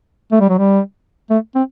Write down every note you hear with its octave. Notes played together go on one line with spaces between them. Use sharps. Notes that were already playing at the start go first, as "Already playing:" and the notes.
A3
G3
F#3
G3
A3
C4